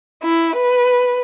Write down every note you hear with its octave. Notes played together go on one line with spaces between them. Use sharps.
E4
B4